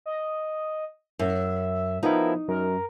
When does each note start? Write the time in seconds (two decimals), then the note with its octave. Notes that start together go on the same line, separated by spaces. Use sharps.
0.06 D#5
1.19 F#2 E5
2.03 F3 B3 D#4 E4 A#4
2.48 F#2 A#4